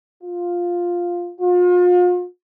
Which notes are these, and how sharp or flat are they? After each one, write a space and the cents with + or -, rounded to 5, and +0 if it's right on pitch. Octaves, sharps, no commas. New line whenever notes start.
F4 +5
F4 +40